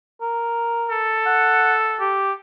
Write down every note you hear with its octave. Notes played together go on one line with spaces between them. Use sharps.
A#4
A4
F#5
G4